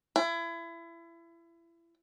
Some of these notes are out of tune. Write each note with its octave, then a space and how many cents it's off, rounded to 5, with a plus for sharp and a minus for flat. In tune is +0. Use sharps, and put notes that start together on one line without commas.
E4 +30